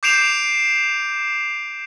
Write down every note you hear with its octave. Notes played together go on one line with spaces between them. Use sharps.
D6 G6 C7 D7 E7 F7